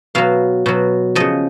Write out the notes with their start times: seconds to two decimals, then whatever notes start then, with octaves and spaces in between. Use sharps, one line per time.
0.15 B2 F#3 F5
0.66 B2 F#3
1.15 C#3 F3 D#5